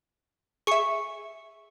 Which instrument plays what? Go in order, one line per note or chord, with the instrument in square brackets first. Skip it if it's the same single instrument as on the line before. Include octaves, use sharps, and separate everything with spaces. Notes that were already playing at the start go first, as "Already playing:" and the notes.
[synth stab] G#4 E5 [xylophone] C#6 C#7